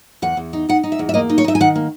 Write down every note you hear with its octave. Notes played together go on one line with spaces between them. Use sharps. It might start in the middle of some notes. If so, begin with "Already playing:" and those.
E2 F#5
E2
D#4
D#4 F#5
D#4
E5
E2
E5
A#3 D#5
D#4
C#5
D#4 E5
G#5
D#3 F#5
A#3